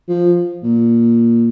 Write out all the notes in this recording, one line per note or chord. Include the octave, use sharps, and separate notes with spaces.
F3
A#2